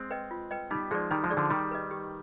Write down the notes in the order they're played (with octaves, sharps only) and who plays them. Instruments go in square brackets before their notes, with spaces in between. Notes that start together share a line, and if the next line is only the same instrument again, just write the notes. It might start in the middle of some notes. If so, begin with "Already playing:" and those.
Already playing: [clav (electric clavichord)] G#3 C4
[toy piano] B4 D#5 G5
F4
B4 D#5 G5
[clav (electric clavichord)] G3 B3 [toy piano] D#4
[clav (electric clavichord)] F3 G#3 [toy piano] G#4 D5
[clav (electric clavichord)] D#3 G3 [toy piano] D#4
[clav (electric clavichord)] F3 G#3
[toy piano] G#4 D5
[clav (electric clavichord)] D3 F3
[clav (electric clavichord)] D#3 G3 [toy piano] G4
[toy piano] B4 D#5
G4